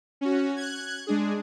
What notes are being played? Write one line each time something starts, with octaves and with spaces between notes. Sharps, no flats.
C#4 F#4
F#6 G#6
G#3 D4 G#4